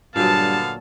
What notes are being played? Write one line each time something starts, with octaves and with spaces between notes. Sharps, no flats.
G2 A#2 D3 F#3 B3 F5 A5